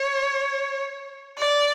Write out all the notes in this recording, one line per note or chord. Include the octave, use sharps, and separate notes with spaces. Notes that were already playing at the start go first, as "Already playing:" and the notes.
Already playing: C#5
D5